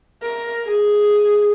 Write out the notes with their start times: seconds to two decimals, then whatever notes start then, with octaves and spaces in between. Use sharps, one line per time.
0.23 A#4
0.65 G#4